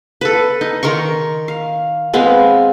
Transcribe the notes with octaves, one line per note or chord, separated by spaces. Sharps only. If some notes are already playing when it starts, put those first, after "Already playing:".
A4 B4
D#4
D#3 A#4 C6 C#6
F5
G#3 B3 C4 F5